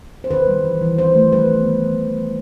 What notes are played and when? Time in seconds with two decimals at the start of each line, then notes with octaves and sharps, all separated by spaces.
0.24 C5
0.31 D#3 B4
0.48 G3
0.65 E3
0.81 E3
0.98 E3 C5
1.15 A3
1.32 G3 B4
1.50 B3
1.66 D#3
1.84 D#3
2.01 E3
2.17 G3